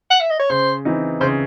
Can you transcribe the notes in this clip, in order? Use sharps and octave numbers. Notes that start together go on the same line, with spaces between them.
F#5
E5
D#5
C#5
C#3 C5
E3 C4 D#4
C#3 C5